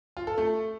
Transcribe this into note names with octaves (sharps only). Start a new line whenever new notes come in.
F4
A4
A3